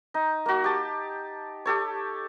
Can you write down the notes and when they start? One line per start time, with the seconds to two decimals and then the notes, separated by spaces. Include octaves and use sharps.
0.14 D#4
0.46 A#3 F#4
0.64 G4 A5
1.66 G4 A4 C#5